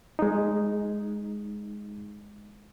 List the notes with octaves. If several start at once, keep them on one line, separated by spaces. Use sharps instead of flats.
G#3 D#4